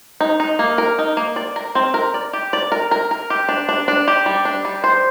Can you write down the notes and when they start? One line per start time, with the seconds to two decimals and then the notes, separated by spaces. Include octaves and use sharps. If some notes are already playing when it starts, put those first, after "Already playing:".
0.20 D#4
0.40 D#4
0.59 A#3
0.78 A#4
0.99 D#4
1.17 A#3
1.36 D5
1.56 A#4
1.75 C4
1.94 A#4
2.14 D5
2.33 G4
2.53 D5
2.72 A#4
2.91 A#4
3.11 A#4
3.30 G4
3.49 D4
3.69 D4
3.88 D4
4.08 G4
4.26 G3
4.45 D4
4.65 G3
4.84 C5